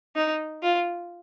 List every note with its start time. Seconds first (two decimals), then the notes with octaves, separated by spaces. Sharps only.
0.16 D#4
0.63 F4